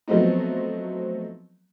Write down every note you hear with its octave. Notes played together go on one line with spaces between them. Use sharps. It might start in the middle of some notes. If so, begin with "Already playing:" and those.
F3 F#3 A3 B3 C4 D#4